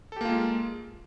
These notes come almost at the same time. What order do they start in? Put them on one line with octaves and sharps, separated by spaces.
A4 G4 A#3 F4 G#3